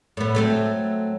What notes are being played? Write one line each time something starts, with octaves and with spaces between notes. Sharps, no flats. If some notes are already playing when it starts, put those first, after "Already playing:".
A2 B3
F#3 A3 C4